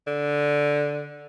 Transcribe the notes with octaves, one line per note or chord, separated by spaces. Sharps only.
D3